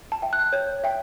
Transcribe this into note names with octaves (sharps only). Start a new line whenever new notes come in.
A5
E5 G5
F#6
C#5 G6
E5 G5